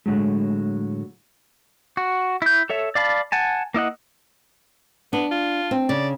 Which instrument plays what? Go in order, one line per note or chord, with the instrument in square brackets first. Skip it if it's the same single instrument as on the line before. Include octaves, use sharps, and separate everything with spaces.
[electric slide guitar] A2 D3 F#3 G#3
[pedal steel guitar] F#4
E4 G6
A4 C#5 E5
D5 F5 A5 B5
F#5 G#5 A5
A#3 E4 D#5 F#5
[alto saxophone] B3 [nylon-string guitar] D4
[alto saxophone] F4
[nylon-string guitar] C4
[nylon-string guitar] C#3 [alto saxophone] D5